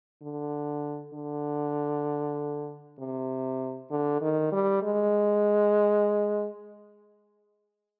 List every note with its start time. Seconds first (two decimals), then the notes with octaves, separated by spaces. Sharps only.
0.22 D3
1.13 D3
2.99 C3
3.90 D3
4.22 D#3
4.52 G3
4.82 G#3